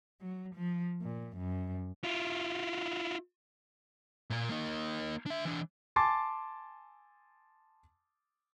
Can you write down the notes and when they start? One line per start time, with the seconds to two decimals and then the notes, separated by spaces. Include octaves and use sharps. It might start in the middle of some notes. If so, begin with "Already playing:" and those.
0.21 F#3
0.55 F3
1.02 A#2
1.37 F#2
2.04 E4 F4
4.30 A#2 A#3
4.50 A#3 D#4
5.26 D4 E5
5.45 E3 D4
5.96 G#5 A5 C6 D6 A6